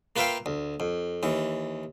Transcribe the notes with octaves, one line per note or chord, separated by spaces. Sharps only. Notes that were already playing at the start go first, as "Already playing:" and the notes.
A#3 F4 B4 E5 F5 G5
D2
F2
D#2 E3